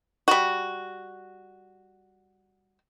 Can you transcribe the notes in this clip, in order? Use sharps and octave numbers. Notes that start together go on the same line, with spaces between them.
G3 F#4